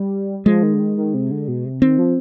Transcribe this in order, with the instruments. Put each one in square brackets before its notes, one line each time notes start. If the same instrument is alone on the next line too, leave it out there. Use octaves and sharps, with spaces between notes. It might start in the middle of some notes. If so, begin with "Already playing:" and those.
Already playing: [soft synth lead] G3
[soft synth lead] F3 [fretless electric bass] G#3
[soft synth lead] D#3
D3
D#3
D#3
C3
D3
B2
C3
[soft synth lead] D#3 [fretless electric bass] C4
[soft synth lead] F3